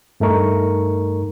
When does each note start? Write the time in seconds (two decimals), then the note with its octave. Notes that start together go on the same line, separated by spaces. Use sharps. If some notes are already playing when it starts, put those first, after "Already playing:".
0.20 G2 A3 D#4 A#4 C#6